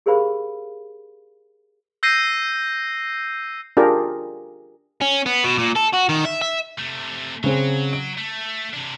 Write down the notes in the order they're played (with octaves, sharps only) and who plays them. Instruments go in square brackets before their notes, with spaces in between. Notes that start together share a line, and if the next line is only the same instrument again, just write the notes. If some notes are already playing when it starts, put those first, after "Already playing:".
[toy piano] G4 G#4 A#4 C5 F5 B5
[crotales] E6 G6 A#6 C7 D#7
[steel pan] D4 F4 G4 G#4 A#4
[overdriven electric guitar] C#4
B3
B2
A#2
A4
F#4
D#3
E5
E5
[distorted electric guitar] C3 A3
[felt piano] C#3 C4 G#4 [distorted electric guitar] F#3
[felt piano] D7
[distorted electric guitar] A3
C3 D4